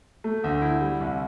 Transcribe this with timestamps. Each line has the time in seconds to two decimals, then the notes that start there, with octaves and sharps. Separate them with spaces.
0.24 A3
0.44 D2
0.62 E4
0.81 G3
1.01 C2